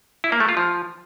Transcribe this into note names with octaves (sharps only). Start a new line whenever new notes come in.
E4
A#3
A3
F4
F3